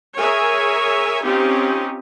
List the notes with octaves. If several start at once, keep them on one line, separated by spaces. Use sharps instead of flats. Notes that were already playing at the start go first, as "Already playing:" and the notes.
G#4 A#4 C#5 E5 G#5
C4 C#4 D#4 F4 G4